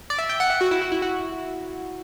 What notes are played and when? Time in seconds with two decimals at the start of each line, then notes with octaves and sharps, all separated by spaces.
0.10 D5
0.19 E5
0.29 G5
0.40 F#5
0.50 E5
0.61 F#4
0.71 E4
0.81 F#4
0.92 E4
1.02 F#4